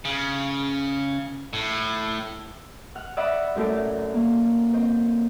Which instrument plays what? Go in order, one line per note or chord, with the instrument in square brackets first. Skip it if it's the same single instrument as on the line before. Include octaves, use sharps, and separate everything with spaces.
[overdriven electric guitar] C#3
A2
[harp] F#5 F6
C#5 D5 E5 F#5 B5 D#6
F#2 A2 A3 A#4 D5
A#3
C4 C5 D#5